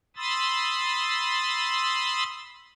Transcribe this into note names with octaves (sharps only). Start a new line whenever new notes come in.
B5 C6 D#6 E6 A6